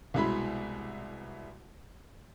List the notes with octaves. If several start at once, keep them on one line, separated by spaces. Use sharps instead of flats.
C2 B2 G#3 E4 B5